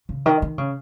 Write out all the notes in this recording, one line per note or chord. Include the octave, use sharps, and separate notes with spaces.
C#3
D#3
D#3
C#3